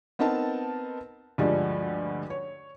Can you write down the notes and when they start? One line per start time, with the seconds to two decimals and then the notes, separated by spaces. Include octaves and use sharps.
0.19 B3 C4 D#4 A#4 A5
1.38 D2 G2 F3 G3 G#3
2.30 C#5